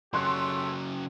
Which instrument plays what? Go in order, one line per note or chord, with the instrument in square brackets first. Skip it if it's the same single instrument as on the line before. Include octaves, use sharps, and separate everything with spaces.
[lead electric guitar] C#3 F#3 [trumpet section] A3 G4 C#5 [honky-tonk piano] C6 F#6